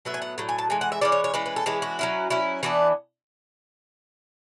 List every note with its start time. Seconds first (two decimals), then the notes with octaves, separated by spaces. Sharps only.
0.05 A2 F#3 B3 E5
0.14 G#5
0.22 F#5
0.38 A2 F#3
0.49 G#5
0.58 A5
0.70 E3 G#3 G#5
0.81 F#5
0.92 E5
1.01 E3 G#3 C#4 D5
1.12 C#5
1.24 C#5
1.34 E3 G#3 C#4 B4
1.46 B4
1.56 A4
1.66 E3 G#3 C#4 G#4
1.82 F#4
1.99 F#3 C#4 E4
2.30 F#3 C#4 E4
2.63 E3 B3 D4 F#4